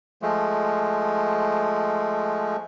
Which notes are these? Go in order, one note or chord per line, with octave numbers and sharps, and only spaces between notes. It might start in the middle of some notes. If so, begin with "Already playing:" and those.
F3 G#3 A3